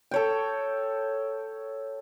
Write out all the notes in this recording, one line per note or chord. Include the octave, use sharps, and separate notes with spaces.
A4 C#5 G5